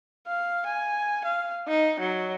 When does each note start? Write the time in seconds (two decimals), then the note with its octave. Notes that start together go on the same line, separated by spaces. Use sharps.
0.27 F5
0.66 G#5
1.25 F5
1.68 D#4
2.00 F#3